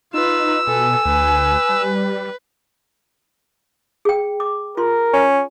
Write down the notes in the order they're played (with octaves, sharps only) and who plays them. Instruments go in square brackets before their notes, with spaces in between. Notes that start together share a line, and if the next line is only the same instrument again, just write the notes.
[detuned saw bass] D#4 [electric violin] F4 B4 [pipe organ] E6
[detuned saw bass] B2 [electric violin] A4 B4 [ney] G#5
[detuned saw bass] D2 [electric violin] B4
[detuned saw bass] G3
[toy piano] G#4 G5
D6
[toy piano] F4 C6 [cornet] A#4
[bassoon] C#4